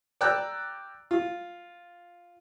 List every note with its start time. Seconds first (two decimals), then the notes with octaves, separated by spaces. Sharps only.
0.21 D5 G5 A#5 E6 F#6
1.11 F4